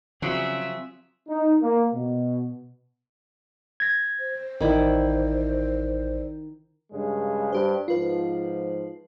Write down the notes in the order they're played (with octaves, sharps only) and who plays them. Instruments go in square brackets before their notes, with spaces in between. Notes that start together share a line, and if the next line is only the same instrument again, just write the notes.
[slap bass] C#3 [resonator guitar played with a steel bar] F3 F#3 [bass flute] C4 [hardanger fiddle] G#4 E5
[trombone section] D#4
A#3
B2
[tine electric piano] G#6 A#6
[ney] C5
[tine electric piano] A1 D5 [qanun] D#3 E4
[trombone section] G2 C#3 G#3
[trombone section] G2 [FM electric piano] G4 C5
[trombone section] G#2 F3 [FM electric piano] F4 B4